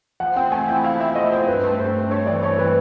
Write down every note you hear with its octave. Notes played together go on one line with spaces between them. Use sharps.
F3 F#5
C4 G5
A3 G#5
E4 G5
E4 F5
E4 E5
A3 D#5
C4 C5
G2 B4
A3
G2 C5
G2
A3 C#5
E3 D5
A3 C#5
E3 B4